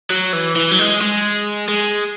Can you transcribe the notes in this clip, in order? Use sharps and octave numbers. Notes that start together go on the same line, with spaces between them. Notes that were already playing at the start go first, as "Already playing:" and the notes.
F#3
E3
E3
F#3
G#3
G#3
G#3